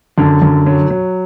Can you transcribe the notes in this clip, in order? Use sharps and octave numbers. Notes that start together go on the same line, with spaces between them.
F#2 D3
F#2
F#3
F#3